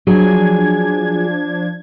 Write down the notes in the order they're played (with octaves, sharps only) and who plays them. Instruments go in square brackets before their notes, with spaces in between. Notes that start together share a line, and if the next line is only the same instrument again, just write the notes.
[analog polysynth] F3 D4 G#6 [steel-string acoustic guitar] F#3 G#4